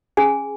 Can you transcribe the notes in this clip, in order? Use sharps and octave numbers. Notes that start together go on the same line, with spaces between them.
C#4 G#4 G#5